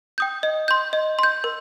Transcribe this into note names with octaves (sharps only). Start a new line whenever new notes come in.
G5 D#6 G6
D#5
C6 G6
D#5
C6 G6
A#4